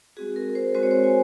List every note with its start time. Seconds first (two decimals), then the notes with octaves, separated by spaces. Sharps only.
0.17 G#3 C4 F#4 G#4
0.36 A#4
0.55 C5
0.75 G#3 C4 F#4 C5
0.83 C#5
0.91 C5
1.04 G#5